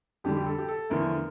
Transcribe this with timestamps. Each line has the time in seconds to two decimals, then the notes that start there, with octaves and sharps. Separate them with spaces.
0.24 F2 D3 G3 G4
0.37 G4
0.46 A4
0.58 G4
0.68 A4
0.90 E2 D3 F3 A3 A#4